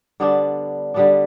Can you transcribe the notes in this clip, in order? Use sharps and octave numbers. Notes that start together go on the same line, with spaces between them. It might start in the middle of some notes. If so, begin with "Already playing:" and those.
D3 G3 B3 D4
D3 G3 B3 D4